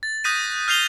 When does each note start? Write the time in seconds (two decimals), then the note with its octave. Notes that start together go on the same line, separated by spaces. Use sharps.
0.03 A6
0.24 D#6 F#6 G6 A#6 B6 D#7
0.68 F6 G6 C7 F7 G7